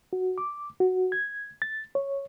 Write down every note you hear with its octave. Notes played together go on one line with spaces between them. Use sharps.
F#4
D6
F#4
G#6
A6
C#5